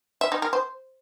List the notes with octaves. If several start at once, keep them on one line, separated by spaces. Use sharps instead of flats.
E5
D#4
A#4
C5